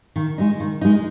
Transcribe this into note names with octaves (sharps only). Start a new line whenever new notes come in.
D#3
G#3 D#4
D#3
G#3 D#4